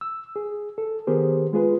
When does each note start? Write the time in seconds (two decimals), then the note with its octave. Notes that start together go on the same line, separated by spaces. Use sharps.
0.01 E6
0.36 G#4
0.78 A4
1.07 D#3 B3 G4 G#4 A#4 C5
1.53 G#3 F4 G#4 B4